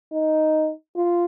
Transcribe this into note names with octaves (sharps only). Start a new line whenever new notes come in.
D#4
F4